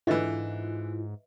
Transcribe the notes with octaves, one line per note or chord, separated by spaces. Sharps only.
G#2 D3 E3 E4 F4 B4 D#5 E5